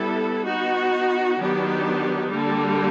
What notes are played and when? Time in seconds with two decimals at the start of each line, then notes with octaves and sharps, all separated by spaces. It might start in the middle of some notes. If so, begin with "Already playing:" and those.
Already playing: G3 B3 E4 A4
0.47 B3 D#4 F#4
1.40 D#3 F#3 B3 D4 G4
2.32 D3 G3 A#3